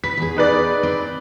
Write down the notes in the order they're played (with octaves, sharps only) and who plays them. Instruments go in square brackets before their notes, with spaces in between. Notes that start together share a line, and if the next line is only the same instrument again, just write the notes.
[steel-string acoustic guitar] B4 [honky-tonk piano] B6
[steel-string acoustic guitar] E2 G#4
[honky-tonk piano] D#4 B4 D5
[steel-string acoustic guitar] C4